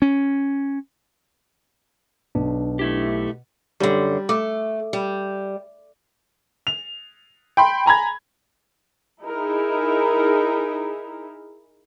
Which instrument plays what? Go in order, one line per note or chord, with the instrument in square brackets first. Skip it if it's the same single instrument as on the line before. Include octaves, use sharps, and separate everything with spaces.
[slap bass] C#4
[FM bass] B1 [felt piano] B2 [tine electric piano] D4
[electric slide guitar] A3 E4 G4
[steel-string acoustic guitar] F#2 D3 [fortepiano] G3
[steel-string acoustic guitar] A3 [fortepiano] D6
[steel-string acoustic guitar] G3
[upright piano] F7
G5 B5 C6
G#5 A#5 B5 G#6
[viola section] D#4 E4 G#4 A#4